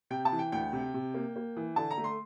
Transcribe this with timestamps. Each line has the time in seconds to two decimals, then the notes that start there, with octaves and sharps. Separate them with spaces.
0.10 C3 G5
0.25 A5
0.32 E3
0.39 G5
0.52 D2 G5
0.73 C3
0.94 C3
1.14 A#3
1.36 A#3
1.57 E3
1.76 D3 A5
1.91 A#5
1.98 A3
2.04 C6